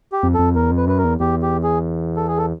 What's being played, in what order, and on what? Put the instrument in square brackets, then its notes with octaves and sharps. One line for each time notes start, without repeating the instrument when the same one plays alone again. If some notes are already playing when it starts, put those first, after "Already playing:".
[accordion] G4
[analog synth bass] F2
[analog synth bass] F2 [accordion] A4
[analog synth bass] E2 [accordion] A#4
[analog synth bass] F2
[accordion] B4
[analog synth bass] F#2 [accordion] B4
[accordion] A#4
[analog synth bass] E2
[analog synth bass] E2 [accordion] G4
[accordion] G4
G#4
A4
G#4
A4